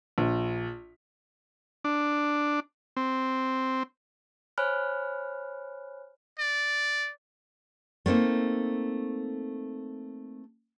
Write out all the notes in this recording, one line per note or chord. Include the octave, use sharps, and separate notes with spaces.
A#1
D4
C4
C5 C#5 G#5 B5 F6 F#6
D5
A3 A#3 C4 D#4